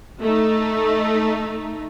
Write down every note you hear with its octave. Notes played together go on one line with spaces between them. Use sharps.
A3 D#4